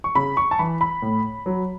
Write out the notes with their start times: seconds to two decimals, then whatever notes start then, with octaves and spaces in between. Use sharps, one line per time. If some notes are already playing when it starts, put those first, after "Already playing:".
0.04 C#6
0.15 C#3 B5
0.37 C#6
0.51 A5
0.59 E3 B5
0.81 B5
1.02 A2
1.46 F#3